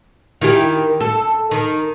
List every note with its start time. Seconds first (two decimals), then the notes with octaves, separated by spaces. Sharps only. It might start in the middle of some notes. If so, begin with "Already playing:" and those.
0.41 D#3 E4 G4
1.00 A4
1.51 D#3